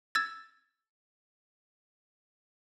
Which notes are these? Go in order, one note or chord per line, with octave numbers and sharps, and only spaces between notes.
E6 G#6 A6